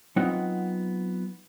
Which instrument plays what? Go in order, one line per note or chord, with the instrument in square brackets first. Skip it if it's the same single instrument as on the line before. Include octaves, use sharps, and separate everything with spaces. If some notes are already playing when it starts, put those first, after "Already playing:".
[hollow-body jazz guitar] F#3 B3 C4 D#4 F4 F#5